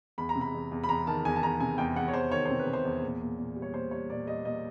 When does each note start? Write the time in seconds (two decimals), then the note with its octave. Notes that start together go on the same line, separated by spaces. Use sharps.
0.18 E2 B5
0.29 A#5
0.36 C3
0.41 B5
0.54 E2
0.71 E2
0.84 B5
0.89 E2 A#5
1.07 D#3 A5
1.25 E2 G#5
1.36 A5
1.43 E2 A#5
1.60 C3 G#5
1.78 E2 G5
1.96 E2 F#5
2.08 C#5
2.13 E2 C5
2.31 D#3 C#5
2.46 C3 C5
2.59 B4
2.67 C3
2.73 C5
2.85 E2
3.02 A#2
3.21 A#2
3.38 A#2
3.56 G3
3.62 C#5
3.74 A#2 C5
3.91 G3 C#5
4.10 A#2 D5
4.27 G3 D#5
4.45 A#2 D#5